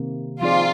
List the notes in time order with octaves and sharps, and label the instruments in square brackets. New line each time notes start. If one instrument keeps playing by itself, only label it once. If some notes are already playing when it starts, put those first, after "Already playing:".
Already playing: [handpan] C3 D#3 A#3
[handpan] F3 C4 D#4 G#4 D5 [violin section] F4